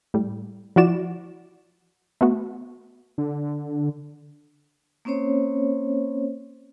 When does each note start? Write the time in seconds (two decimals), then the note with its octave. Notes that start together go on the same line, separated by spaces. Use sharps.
0.14 A2 G3
0.76 F3 E4 F#4 D5 E7
2.21 A3 B3 F#4
3.18 D3
5.05 A#3 C4 C#4 C5 C#5